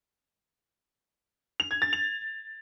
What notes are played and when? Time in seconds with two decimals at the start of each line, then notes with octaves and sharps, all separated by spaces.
1.60 F7
1.71 G#6
1.82 A6
1.93 F7